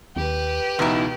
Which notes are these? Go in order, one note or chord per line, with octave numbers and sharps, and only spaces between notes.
D#2 G4 B4
C#2 B2 E3 D#4 E4 A#5